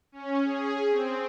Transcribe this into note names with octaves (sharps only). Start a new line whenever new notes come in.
C#4
G#4
C4